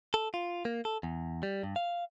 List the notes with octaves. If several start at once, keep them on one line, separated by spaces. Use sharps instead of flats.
A4
F4
A#3
A4
E2
G3
G2
F5